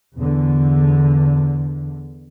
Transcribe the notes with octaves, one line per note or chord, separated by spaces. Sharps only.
E2 D3